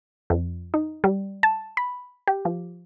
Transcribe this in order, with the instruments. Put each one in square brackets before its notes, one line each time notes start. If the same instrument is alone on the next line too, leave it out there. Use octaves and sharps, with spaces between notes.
[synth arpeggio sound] F2
D#4
G3
A5
B5
G4
F3